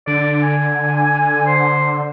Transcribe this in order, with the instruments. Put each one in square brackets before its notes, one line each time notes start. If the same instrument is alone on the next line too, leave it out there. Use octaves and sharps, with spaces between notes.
[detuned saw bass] D3 [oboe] D5
[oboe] G#5
C5